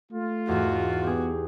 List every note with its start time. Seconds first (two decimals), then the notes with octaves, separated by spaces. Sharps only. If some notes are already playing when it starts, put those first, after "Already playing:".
0.12 A3 F4
0.49 E2 G#2 F#4
1.04 B3 G4 G#4